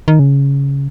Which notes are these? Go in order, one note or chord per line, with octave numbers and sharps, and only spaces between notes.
D#3
C#3